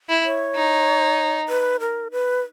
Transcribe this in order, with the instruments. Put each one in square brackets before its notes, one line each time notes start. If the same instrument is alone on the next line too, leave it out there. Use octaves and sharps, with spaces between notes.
[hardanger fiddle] E4
[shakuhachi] C#5
[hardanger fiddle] D#4
[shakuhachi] B4
A#4
B4